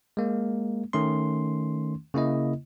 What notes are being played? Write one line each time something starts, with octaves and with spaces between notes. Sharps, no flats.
G#3 A#3
D#3 A3 C#4 C6
C#3 A#3 E4 D#5